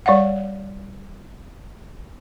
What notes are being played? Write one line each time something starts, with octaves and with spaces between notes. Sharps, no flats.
G3 D5 F5 F#5